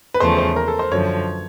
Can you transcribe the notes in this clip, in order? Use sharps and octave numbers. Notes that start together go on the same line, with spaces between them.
B4
E2 C#3 F3 A3 C5
C5
A#4
A4
C5
F#2 D3 F3 C#5